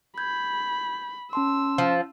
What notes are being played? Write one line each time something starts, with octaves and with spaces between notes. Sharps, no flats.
B5 G6 G#6
C#4 A5 C6 E6
F3